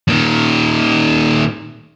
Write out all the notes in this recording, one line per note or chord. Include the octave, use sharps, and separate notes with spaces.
A#2 D#3